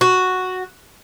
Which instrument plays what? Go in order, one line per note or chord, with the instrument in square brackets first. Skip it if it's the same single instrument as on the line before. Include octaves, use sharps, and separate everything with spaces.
[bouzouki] F#4